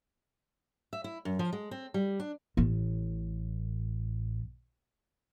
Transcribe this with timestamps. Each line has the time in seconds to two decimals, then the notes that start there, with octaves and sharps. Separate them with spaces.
0.93 E5
1.04 E4
1.25 F#2
1.39 F3
1.53 G#3
1.71 C4
1.94 G3
2.20 D4
2.57 A1 A2